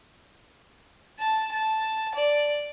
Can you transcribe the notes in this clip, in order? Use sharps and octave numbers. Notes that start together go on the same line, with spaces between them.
A5
A5
D5